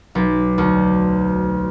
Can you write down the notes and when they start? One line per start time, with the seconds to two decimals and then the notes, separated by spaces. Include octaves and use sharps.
0.15 B1
0.58 D2